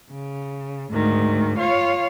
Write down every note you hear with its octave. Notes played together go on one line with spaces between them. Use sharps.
C#3
D2 G#2 D#3
F4 C#5 F5